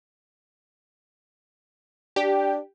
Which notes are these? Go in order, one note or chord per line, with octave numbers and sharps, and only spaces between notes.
D4 G4